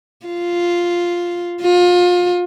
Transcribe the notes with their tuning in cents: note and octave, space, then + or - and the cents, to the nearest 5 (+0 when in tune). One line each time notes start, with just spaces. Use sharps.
F4 +0
F4 +30